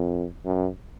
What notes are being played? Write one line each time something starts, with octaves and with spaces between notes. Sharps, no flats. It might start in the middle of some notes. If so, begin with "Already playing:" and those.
Already playing: F2
F#2